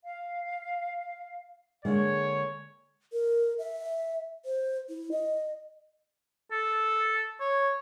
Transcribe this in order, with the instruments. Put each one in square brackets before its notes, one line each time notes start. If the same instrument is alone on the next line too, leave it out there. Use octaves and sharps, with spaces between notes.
[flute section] F5
[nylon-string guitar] D3 G#3 A#3 [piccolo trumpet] C#5
[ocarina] A#4
E5
C5
E4
D#5
[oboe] A4
C#5